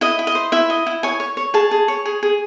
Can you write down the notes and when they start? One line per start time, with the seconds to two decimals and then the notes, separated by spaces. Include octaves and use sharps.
0.01 E4 D#5
0.19 E4
0.27 D#5
0.35 C5
0.52 E4 E5
0.70 D#5
0.86 E4
1.03 C#5 G#5
1.20 C#5
1.37 C#5
1.54 G#4 A5
1.71 G#4
1.88 C#5
2.05 G#4
2.23 G#4